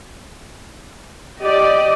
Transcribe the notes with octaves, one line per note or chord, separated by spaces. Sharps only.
G4 D5 D#5